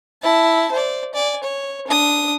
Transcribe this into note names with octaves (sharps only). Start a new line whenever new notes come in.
E4 A5
C5 D5
D5 G#5
C#5
D4 D#6